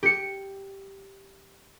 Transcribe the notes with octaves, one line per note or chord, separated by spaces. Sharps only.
G4 C#7